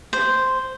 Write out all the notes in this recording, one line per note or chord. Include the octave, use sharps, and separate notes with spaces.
C5